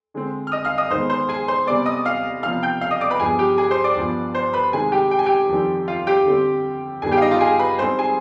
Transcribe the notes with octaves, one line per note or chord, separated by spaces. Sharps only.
D3 G#3 C4
F6
D#5 D#6
F5 F6
D#5 D#6
G#2 D#3 G#3 B3 C5 C6
C5 C6
G#4 G#5
C5 C6
C3 G3 B3 D5 D6
D#5 D#6
F5 F6
C3 F3 B3 F5 F6
G5 G6
F5 F6
D#5 D#6
D5 D6
B4 B5
G2 F3 B3 G#4 G#5
G4 G5
G#4 G#5
C5 C6
D5 D6
G2 F3 B3
C5 C6
B4 B5
C3 D#3 G#3 G#4 G#5
G4 G5
G5
G#5
G4 G5
F2 D#3 G3 C4
F4 F5
G4 G5
D3 G3 C4
G2 D#3 G3 B3 G#4 G#5
G4 G5
F5
D#4 D#5
F4 F5
G#4 G#5
B4 B5
G#2 G3 C4 C5 C6
G#4 G#5